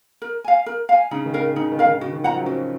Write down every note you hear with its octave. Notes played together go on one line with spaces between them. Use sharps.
A#4
F5 G#5
A#4
F5 G#5
C#3 D#4
D#3
A#4 F5
C#3
C#3 D#4
D#3
A#4 F5
D#3
C#3 F#4
D#3
F3 C5 F#5 A#5
F#3
C#4
C4 F#4